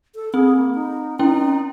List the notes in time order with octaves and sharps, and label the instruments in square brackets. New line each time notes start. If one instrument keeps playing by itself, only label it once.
[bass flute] A4
[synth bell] C4 [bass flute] G#4
[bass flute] A#3
D#4
[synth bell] C#4 E4 G5 [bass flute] D#4